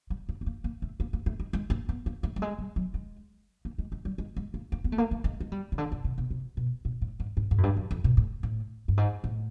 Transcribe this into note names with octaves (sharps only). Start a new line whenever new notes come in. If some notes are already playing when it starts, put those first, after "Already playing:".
G3
A#3
B3
A#3
A#3
A3
A#3
A#3
A3
G#3
G#3
A#3
B3
A#3
A3
G3
G#3
G3
F#3
G#3
A#3
G#3
G#3
G3
G#3
G#3
A#3
A#3
B3
A3
A#3
A3
G#3
G#3
G3
C#3
D3
C#3
C3
B2
C3
B2
A#2
A2
G#2
G#2
G#2
F#2
G2
F#2
F2
B2
A2
A2
G2
G#2
A2